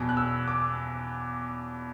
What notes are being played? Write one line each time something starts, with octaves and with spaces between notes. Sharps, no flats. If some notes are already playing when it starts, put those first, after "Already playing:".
Already playing: E2 B2
F#6
E6
D6